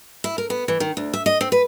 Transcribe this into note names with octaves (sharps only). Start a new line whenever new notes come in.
E4
A#4
B3
E3
D#3
D2
E5
D#5
C4
B4